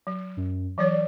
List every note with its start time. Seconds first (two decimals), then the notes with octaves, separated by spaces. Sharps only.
0.07 F#3
0.37 F#2
0.78 E3 F#3 C#5 D5